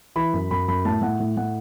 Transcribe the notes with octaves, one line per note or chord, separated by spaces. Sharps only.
E3 B5
F#2
F#2 B5
F#2 B5
A2 A5
A2 F#5
A2
A2 F#5